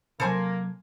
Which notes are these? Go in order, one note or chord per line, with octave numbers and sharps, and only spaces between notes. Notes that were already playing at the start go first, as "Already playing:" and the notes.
C3 F#3 A#3 A4 C5 G#5